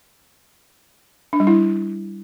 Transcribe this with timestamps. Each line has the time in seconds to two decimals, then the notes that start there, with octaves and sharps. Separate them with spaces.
1.33 D4
1.40 G3
1.47 E4